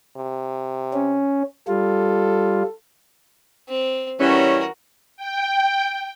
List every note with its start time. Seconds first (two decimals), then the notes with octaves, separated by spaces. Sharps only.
0.17 C3
0.93 C#4
1.68 G3 F4 A4
3.69 C4
4.20 E3 G3 C#4 F#4 A#4
5.17 G5